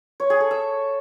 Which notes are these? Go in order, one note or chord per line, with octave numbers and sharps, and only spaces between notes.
C#5
G#4
A4
E5